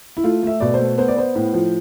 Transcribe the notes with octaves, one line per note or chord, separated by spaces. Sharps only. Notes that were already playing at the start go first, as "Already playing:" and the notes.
E4
A3 F4
A3 E5
B2 D5
C5
A3
B3 C5
D5
B3 C5
A2
F3